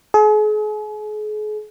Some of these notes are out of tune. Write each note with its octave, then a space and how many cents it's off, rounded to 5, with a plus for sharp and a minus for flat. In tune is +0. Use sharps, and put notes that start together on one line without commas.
G#4 +40